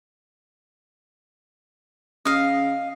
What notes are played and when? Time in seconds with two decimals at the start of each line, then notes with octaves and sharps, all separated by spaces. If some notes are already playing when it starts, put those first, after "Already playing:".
2.25 C#3 D#5 F5